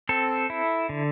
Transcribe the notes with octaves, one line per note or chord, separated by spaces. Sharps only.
C4 A4
E4
D3